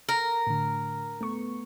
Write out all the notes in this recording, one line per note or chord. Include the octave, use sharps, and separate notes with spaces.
A#4
A2 D3
A3 B3 C#6